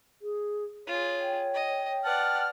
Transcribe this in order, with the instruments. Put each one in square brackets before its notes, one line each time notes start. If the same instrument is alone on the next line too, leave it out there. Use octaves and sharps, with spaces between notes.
[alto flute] G#4
[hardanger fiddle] F4 G#4 [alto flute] C#5
[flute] G5
[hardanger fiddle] D#5
[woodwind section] B4 A5 F6 [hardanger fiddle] D5 F#5